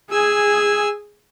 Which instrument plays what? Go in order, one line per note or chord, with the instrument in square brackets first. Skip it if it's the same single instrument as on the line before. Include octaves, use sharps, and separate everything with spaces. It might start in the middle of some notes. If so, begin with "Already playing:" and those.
[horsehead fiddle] G#4 [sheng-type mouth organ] G#5 E6